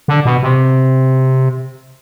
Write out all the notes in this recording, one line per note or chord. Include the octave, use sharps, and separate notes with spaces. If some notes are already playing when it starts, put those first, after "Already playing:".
D3
B2
C3